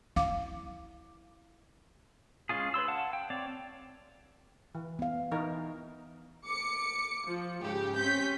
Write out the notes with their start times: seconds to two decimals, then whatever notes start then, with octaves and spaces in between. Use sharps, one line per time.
0.16 E4 F5 D6
2.49 G#3 C#4 F4 G#4
2.74 B4 C#5 C6 E6
2.88 F5 F#5 A5
3.13 G5
3.30 C4 C#5 D5
4.75 E3
4.99 B3 F5
5.31 E3 D#4 A#4
6.47 D6 C#7
7.28 F3
7.62 G#2 C#3 G4
7.98 C4 C#4 G6 B6